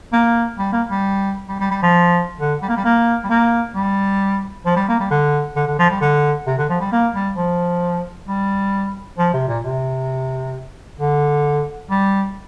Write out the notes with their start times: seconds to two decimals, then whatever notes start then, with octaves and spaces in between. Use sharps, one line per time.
0.13 A#3
0.59 G3
0.72 A#3
0.89 G3
1.49 G3
1.60 G3
1.71 G3
1.83 F3
2.39 D3
2.62 G3
2.69 A#3
2.77 G3
2.84 A#3
3.24 G3
3.30 A#3
3.75 G3
4.66 F3
4.76 G3
4.89 A#3
5.00 G3
5.11 D3
5.56 D3
5.67 D3
5.78 F3
5.90 G3
6.01 D3
6.47 C3
6.58 D3
6.69 F3
6.80 G3
6.92 A#3
7.14 G3
7.37 F3
8.27 G3
9.18 F3
9.33 C3
9.48 A#2
9.64 C3
11.00 D3
11.90 G3